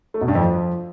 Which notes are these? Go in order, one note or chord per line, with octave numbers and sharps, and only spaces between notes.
A3
B2
G2
F2
F3